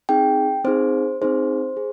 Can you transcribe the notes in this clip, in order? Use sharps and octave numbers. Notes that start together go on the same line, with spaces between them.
C4 D#4 G#4 G5
C4 D#4 G#4 C5
C4 D#4 G#4 C5
G#4